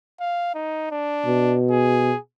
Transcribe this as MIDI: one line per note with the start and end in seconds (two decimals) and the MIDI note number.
0.20 0.51 77
0.55 0.89 63
0.91 1.56 62
1.26 2.13 47
1.70 2.19 68